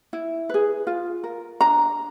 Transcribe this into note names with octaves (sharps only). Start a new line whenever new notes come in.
E4
G#4 B4
F4
A#4
D4 A#5